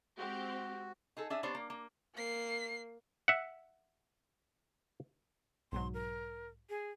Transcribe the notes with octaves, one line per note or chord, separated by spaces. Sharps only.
G#3 C4 F#4 G4
D#4 G#4 A4
D4 G#4 E5
B3 D4 G4 C5 C#5
A#3
A#3
A#3 C7
E5 F#5
B1 G#2 F#3 C6
A#4
G#4